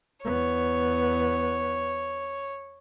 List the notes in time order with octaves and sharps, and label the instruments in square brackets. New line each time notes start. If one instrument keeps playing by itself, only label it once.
[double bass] E2 B3 [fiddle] C#5